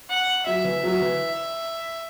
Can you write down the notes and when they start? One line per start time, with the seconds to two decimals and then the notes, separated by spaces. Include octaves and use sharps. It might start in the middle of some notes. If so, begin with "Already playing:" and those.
0.10 F#5
0.46 F#3 E5
0.64 E3
0.84 F#3
1.01 E3